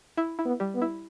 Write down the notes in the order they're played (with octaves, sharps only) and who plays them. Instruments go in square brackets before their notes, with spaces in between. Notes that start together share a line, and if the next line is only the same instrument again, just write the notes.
[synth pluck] E4
E4
[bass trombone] B3
[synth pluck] G3
[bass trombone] B3
[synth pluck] E4